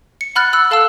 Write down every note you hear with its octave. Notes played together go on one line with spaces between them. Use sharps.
C#7
F#5 B5 F6 F#6 A6
B5 E6 F#6
A4 F5 A5 C6 E6